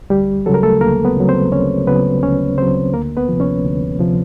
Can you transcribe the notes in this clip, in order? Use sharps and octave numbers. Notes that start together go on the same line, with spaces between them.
D2 G3 G4
C#3 F#3 A4
A#4
A3 A4
D2 A#3 A#4
B3 B4
C#3 F#3
C4 C5
D2 C#4 C#5
C#3 F#3 B3 B4
D2 C#4 C#5
C#3 F#3 C4 C5
D2 A#3 A#4
B3 B4
C3 F3
C#4 C#5
D2
C3 F3